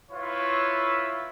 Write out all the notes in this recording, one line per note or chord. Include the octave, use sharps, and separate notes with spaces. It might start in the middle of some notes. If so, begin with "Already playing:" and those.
E4 F4 B4 C#5 E5